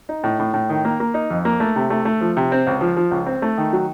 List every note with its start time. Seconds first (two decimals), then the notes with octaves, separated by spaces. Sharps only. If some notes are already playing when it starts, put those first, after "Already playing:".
0.09 D#4
0.24 A2
0.39 A2
0.54 A2
0.69 D#3
0.85 A#3
1.00 A#3
1.14 D#4
1.30 F2
1.45 A#3
1.60 A3
1.76 C3
1.90 A3
2.05 A3
2.21 F3
2.37 C3
2.52 C4
2.67 C#2
2.81 F3
2.97 F3
3.11 C#2
3.26 C4
3.42 A3
3.58 D#3
3.73 F#3